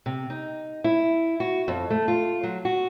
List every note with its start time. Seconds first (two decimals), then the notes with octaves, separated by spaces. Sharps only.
0.06 C3
0.30 D#4
0.84 E4
1.40 F#4
1.68 F2
1.90 A3
2.08 F4
2.43 F#3
2.65 F#4